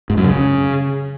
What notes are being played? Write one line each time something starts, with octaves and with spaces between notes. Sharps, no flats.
G#2
F#2
C#3